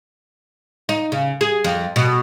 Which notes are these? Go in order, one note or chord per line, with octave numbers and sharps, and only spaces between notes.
D#4
C#3
G#4
F2
B2